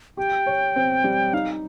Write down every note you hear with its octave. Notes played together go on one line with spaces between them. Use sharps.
G4 G5
C#5
C4
G3
D#4 F5